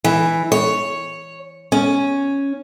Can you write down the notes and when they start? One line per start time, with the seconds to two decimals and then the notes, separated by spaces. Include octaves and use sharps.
0.04 E3
0.52 C#5
1.72 C#4